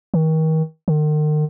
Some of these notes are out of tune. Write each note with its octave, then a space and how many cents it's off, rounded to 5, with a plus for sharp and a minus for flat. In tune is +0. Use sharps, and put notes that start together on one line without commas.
D#3 +35
D#3 -40